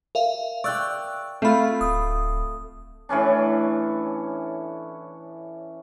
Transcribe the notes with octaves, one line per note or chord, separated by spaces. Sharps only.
A#4 E5 F5
D5 G5 C#6 E6 F#6
A3 C4 F4 B5
D1 D#6
A2 E3 C#4 D4